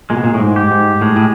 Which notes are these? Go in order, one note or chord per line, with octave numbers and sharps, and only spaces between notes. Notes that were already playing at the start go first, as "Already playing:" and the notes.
A#2 G#3
B2
A#2
A2
G#2
G4
G#2
A2 G#3
A2